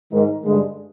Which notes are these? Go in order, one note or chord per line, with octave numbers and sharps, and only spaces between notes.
G#2 D#3 G#3 D#4 A#4
G2 D3 G#3